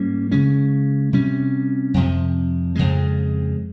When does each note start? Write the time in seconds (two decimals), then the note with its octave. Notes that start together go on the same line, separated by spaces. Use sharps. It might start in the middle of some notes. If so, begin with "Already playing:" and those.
Already playing: G#2 G3 A#3 C#4
0.32 C#3 G#3 C#4
1.13 C3 G3 C#4
1.94 F2 C3 F3
2.75 F2 C#3 G#3